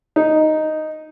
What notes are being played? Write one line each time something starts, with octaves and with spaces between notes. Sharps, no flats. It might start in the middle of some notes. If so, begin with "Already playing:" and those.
D#4